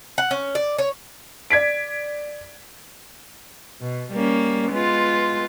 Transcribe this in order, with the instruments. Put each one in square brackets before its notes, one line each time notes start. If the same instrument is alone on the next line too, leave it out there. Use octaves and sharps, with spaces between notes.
[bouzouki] F#5
C#4
D5
C#5
[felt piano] D5 G#6 B6 D7
[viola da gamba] B2
G3 A#3 C#4
G#3 B3 F4